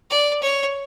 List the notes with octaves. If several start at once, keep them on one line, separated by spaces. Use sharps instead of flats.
D5
C#5